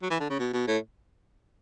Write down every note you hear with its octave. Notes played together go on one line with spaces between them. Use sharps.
F#3
E3
D3
C#3
B2
B2
A2